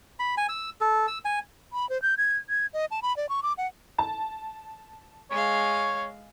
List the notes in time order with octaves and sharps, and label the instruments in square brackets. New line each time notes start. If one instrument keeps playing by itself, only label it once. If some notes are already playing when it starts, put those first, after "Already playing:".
[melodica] B5
G#5
E6
A4
E6
G#5
[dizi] B5
C5
G6
G#6
G#6
D#5
A5
B5
D5
C#6
D6
F#5
[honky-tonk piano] A5
[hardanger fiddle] G#3 F5 [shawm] C#5